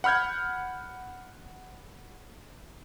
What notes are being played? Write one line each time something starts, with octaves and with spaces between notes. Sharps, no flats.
F#5 B5 F6 G6 G#6